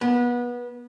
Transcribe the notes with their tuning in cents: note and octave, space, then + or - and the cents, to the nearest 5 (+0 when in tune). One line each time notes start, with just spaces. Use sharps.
B3 -25